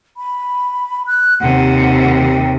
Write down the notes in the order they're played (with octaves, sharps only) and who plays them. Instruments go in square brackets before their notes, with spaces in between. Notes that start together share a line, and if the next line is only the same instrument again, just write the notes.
[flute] B5
F#6
[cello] D#2 C3 [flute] F#5
[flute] G5